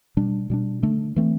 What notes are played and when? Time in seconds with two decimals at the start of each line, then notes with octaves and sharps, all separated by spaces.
0.17 B2 G3 D4
0.50 B2 G3 D4
0.83 D3 A3 D4
1.16 E3 A3 C4